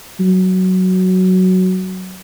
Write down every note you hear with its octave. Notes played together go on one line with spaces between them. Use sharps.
F#3